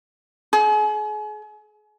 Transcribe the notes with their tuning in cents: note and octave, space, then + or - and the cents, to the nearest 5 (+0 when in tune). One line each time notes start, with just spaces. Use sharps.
G#4 +35